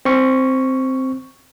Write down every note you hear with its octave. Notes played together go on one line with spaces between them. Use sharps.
C4 C#6